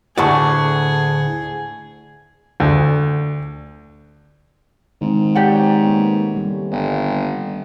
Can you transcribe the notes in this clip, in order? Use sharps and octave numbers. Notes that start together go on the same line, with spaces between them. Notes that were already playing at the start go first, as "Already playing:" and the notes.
D2 A2 G#4 D5 F#5 A5 C#6
D2
G#2 D#3 C4
G4 C#5 D5 F#5
A#3 B3
G3 A3 C#4
G1